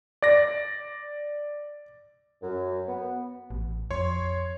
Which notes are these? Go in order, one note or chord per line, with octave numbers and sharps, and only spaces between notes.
D5 A#6
F#2
B3
A1
F2 C#5 C6